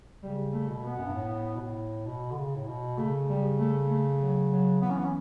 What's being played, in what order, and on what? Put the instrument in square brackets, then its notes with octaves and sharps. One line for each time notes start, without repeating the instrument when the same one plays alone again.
[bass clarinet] C#3 [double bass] G3
[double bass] A3
[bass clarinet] B2
[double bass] B3
[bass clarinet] F#2
G2
A2
B2
A2
B2
D3
C#3
A2
B2
[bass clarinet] C#3 [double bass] A3
[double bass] G3
A3
A3
F#3
F#3
[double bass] E3 [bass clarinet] B3
[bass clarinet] C#4
B3
C#4